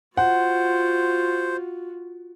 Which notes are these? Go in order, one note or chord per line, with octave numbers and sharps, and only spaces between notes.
F4 F#4 C5 F#5